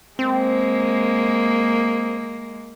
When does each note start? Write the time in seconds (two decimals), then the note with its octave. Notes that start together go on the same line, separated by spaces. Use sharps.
0.19 G#3 A#3 C4